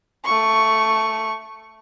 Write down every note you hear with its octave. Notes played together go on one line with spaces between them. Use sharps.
A3 C#6